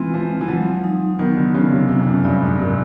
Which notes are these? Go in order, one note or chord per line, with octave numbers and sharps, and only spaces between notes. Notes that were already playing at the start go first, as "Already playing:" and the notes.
Already playing: E3 G#3 C4 F4
F3 G#3
E3
F3 F#3
D#4
D#3 B3
D3
C#3 F#3
C3
C3 F4
F2
F#2
G2 D5
G#2
C3 A#4